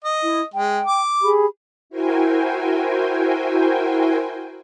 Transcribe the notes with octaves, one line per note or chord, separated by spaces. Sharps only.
D#5
E4
G#3 G5
D6
G4 G#4 B5
E4 F#4 A#4 C5 G5 G#5